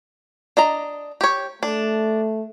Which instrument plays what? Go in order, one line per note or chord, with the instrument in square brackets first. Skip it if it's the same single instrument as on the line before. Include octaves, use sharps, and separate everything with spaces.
[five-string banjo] D4 D#5 A#5
G4 C#5
[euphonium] A3 [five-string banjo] D4